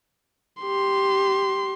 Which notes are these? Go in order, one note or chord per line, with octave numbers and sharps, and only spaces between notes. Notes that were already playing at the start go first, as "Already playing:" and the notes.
G4 C6